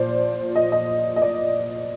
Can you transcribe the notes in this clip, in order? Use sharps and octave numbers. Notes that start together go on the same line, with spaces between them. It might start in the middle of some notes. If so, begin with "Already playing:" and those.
Already playing: A#2 F3 C5 D5
D#5
D#5
D#5
D5